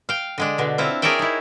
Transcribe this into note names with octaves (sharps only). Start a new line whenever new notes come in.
F5 G5
D3 G#3 D4
B2 D3
C4 E4 F4
G#4 A#4 C#5 D5 E5 G5
D#4 E4